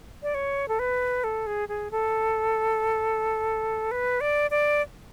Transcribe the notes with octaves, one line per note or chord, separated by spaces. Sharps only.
D5
C#5
A4
B4
A4
G#4
G#4
A4
B4
D5
D5